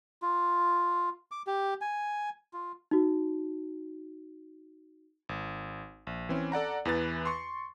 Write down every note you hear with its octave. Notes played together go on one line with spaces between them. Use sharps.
F4
D6
G4
G#5
F4
D#4 F#4
G#1
A#1
E3 C4 C#4
A4 D5 F#5 A#5
E2 E3 B4 A6
C6 C#6